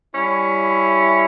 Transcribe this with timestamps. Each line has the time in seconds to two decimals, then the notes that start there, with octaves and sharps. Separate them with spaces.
0.14 G3 C#4 E4